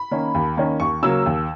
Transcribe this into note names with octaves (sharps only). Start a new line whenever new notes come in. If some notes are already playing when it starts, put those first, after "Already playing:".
Already playing: B5
D#3 A#3 C#4
D#2
D#3 A#3 C#4
D#2 C#6
C#3 F#3 A#3 E6
D#2